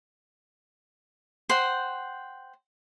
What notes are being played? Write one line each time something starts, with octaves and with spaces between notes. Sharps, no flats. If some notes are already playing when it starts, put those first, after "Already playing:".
C5 F#5 G5